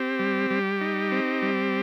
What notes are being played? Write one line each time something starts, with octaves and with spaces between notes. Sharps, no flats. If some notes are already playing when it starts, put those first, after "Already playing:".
Already playing: C4 G4
G3
G3
D#4
C4
G3